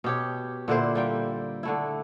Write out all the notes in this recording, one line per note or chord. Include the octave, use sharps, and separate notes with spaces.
B2 G4 C#5
A#2 D3 E4 C5
G3 A#3 G5
D3 A3 E4